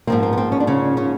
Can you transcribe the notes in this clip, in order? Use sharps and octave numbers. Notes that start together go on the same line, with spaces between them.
G#2 F3 A#3 C4
C4
B3
C4
C#4
D4
C#3 C#4
C#3 C#4